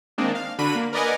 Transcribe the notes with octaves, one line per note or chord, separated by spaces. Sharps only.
D#3 G#3 A#3 C4 D4 D#4
F5
D3 D4 F#4 B5 D#7
A#3
A#4 B4 D5 D#5 F#5 G#5